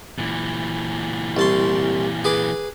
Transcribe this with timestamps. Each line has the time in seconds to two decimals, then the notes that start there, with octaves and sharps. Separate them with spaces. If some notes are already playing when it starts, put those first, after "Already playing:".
0.19 A#2 E3
1.37 C2 A5 C6
2.24 G#4 B4 D6